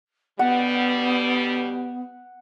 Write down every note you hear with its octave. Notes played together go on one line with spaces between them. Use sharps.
B2 D3 G3 B3 F#5